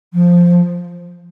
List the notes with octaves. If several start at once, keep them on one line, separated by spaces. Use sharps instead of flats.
F3